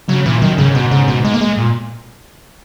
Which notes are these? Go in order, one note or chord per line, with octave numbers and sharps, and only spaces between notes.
C#3 F#3
A#2 E3
F#2 D#3
G#2 C#3
B2
C#3
B2
G#3
A#3
G#3
A#2